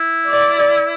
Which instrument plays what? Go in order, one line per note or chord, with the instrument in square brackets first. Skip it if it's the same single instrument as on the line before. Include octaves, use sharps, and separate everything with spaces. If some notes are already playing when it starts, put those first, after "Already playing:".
Already playing: [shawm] E4
[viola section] D5